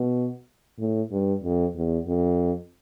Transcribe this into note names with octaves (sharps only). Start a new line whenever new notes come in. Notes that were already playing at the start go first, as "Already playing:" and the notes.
Already playing: B2
A2
G2
F2
E2
F2